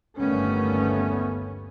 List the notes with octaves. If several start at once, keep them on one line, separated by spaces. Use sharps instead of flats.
G1 D#2 G3 A3 B3 C#4